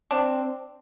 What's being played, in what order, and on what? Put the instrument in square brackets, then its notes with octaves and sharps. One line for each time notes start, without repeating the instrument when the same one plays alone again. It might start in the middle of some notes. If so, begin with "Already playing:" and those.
[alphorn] C4 [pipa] D4